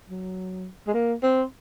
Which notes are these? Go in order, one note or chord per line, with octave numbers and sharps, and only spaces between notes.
F#3
G#3
A#3
C4